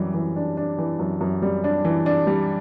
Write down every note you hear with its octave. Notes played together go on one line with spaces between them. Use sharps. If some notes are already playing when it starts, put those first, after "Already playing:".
Already playing: F#2 E3 G3
E3
D4
D4
E3
F#2
F#2
G3
D4
E3
D4
G3